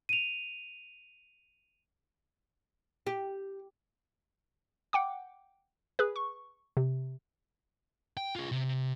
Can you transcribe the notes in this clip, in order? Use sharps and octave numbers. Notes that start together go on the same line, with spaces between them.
D#7 F7
G4
F#5 G5 D6
G#4 B4
C#6
C3
G5
F4 G#4
C3